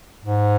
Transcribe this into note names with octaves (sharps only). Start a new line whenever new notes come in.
G#2